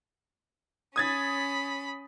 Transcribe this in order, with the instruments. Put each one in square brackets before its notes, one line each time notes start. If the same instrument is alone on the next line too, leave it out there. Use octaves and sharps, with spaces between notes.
[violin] C#4 B5 [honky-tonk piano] D#6 G#6 A6